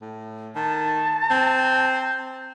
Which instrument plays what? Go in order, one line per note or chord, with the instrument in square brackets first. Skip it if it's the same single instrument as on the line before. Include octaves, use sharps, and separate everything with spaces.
[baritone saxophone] A2
[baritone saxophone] D#3 [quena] A5
[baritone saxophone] C4